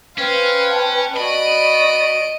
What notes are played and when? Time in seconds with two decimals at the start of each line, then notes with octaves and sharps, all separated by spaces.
0.18 C#4 B4 C5 F5 G5
0.73 A5
1.17 F#4 D5 D#5 B5 D7